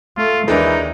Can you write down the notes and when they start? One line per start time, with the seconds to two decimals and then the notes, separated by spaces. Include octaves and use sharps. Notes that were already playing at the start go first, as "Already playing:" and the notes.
0.17 A3 F4
0.48 D#2 E3 G#3 D4 D#4 A#4